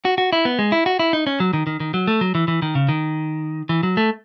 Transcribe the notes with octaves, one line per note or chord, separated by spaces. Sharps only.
F#4
F#4
E4
B3
G#3
E4
F#4
E4
D#4
C#4
F#3
D#3
D#3
D#3
F#3
A3
F#3
E3
E3
D#3
C#3
D#3
E3
F#3
A3